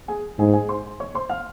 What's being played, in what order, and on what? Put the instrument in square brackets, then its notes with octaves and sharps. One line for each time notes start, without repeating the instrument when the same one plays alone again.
[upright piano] G#4 G#5
[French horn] G#2 [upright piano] G#4 G#5
[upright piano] G#4 G#5
C5 C6
C#5 C#6
C5 C6
F5 F6